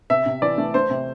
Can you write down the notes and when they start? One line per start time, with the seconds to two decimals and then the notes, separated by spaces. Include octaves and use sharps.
0.10 C3 E5
0.26 C3
0.42 E3 D5
0.58 A3
0.74 A3 C5
0.90 C3